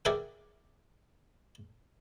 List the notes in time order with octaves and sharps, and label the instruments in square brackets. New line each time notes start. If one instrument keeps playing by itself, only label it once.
[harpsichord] G#4 A#4 D5 E5 F#5 G5